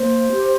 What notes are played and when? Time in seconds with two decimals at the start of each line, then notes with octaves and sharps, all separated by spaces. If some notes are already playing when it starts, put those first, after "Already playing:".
Already playing: A#3 C5
0.32 G4